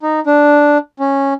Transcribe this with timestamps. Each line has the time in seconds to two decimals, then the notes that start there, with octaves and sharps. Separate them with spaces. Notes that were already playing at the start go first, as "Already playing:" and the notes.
0.03 D#4
0.27 D4
1.00 C#4